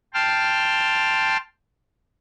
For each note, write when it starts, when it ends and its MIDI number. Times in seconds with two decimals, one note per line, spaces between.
0.14 1.37 79
0.14 1.37 81
0.14 1.37 84
0.14 1.37 89